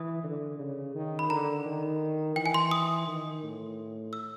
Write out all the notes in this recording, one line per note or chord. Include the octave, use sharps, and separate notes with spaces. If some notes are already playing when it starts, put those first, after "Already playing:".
Already playing: E3 D#6
D3
C#3
D#3
B5
D3 A#5
D#3
E3 G5
G#5
C6
D#6
D#3
A2
E6